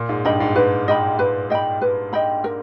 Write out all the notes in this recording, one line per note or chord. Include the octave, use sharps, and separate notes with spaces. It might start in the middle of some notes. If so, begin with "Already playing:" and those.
Already playing: A#2
G#2
G2 D#5 G5 B5
G#2
G#2 B4
D#5 G5 B5
B4
D#5 G5 B5
B4
D#5 G5 B5
A#4